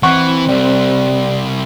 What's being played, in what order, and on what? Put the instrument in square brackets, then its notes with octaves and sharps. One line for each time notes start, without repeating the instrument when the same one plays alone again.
[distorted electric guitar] E3 [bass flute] C4 [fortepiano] F#5 C#6
[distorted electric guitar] C2 [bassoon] G3